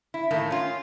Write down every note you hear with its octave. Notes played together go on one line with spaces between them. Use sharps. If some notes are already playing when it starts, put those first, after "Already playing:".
E4
A2 D#3 A3 A#3
C#4 F4